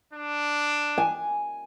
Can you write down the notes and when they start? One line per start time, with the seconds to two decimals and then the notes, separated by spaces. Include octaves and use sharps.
0.13 D4
0.98 G#5